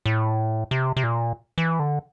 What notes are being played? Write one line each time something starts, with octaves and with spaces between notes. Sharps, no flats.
A2
C3
C3
A#2
E3
D3